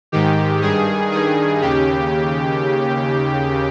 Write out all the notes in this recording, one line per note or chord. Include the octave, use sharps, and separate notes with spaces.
G#2 D#3 G4
G2 D#3 G#4
G2 D#3 G#4
D#2 C#3 G4